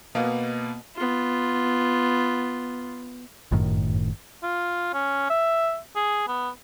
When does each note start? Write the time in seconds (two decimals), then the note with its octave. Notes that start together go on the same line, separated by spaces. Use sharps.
0.15 B2 A#3 B3
0.96 B3 F4
3.51 G1 F#2 A2 D#3
4.43 F4
4.94 C#4
5.30 E5
5.96 G#4
6.28 B3